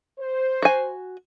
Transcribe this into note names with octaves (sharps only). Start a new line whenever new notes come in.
C5
F#4 G#5